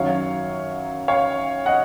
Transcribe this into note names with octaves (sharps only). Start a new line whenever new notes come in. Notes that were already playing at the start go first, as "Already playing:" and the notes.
Already playing: F#2 D#3 F#3 C#5 F5
C#5 F5
D#5 F#5